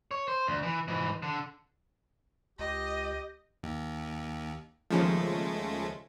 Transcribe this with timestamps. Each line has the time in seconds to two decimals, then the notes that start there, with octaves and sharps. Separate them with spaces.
0.11 C#5
0.28 C5
0.47 D2
0.63 E3
0.88 G#2 E3
1.22 D3
2.59 C#2 G4 D#5
3.63 D#2
4.90 D#2 C#3 F3 G#3 A3